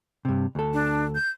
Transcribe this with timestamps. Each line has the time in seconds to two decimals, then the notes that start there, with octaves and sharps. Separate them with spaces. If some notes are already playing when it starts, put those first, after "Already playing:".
0.25 G2 C3
0.55 D2 A4
0.73 D4
1.15 G6